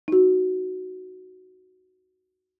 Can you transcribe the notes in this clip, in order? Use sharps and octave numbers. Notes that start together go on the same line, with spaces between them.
D#4 F#4